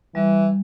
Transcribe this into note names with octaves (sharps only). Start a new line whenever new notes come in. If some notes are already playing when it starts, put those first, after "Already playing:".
E3 G3